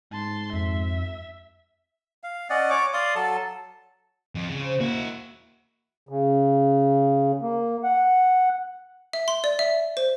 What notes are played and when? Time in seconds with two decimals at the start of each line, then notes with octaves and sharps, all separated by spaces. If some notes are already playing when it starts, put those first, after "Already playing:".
0.12 G#2 A5 C6
0.53 F2 E5
2.24 F5
2.50 C#4 D5 D#5 F#5
2.70 C#5 C#6 D6
2.93 D5 F5 C6 D#6
3.15 F#3 A4 A5
4.35 F2
4.49 C#3
4.61 C5
4.81 A#3 E4 F#4
6.09 C#3
7.42 A#3
7.84 F#5
9.13 E5
9.28 C6
9.44 D5
9.59 E5
9.97 C5